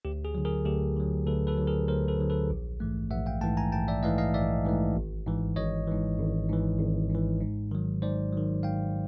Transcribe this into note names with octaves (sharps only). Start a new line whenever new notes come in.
D2 G4
G#4
D3 F#3
G#4 A#4
D2 G4 A4
D3 F#3
D2 A4 B4
A4 B4
D3 F#3
G#4 A#4
D2 A#4 C5
A4 B4
D3 F#3
A4 B4
A#1
G#2 E3 A3
A#1 E5 F#5
F5 G5
G#2 E3 A3 G5 A5
G#5 A#5
A#1 G5 A5
D5 E5
G#2 E3 A3 D#5 F5
D#5 F5
A#1 D5 E5
G#2 E3 A3
G#1
G#2 E3
G#1 C#5 D#5
G#2 E3
G#1
G#2 E3
G#1
G#2 E3
G#2
D#3 F#3
G#2 C5 D5
D#3 F#3
G#2 F5 G5